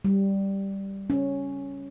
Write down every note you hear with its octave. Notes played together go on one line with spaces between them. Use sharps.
G3
C#4